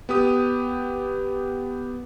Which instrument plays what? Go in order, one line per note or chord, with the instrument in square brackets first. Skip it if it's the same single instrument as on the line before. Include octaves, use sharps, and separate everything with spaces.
[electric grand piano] B3 G4 D#6